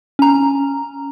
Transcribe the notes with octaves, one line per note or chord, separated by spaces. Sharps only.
C#4 A#5